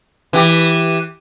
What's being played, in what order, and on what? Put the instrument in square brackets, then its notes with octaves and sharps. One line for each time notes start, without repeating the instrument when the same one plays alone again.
[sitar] E3 G4